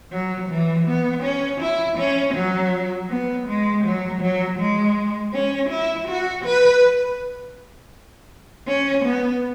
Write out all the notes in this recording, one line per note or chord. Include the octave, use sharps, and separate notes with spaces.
F#3
E3
B3
C#4
E4
C#4
F#3
B3
G#3
F#3
F#3
G#3
C#4
E4
F#4
B4
C#4
B3